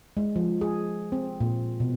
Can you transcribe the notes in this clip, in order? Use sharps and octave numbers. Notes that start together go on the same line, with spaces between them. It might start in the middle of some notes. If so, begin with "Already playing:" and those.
G#3
F3
G#4
C4
A#2
B2